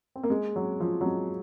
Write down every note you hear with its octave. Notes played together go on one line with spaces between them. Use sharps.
C4
A#3
G#3
F#3
F3
F#3
G#3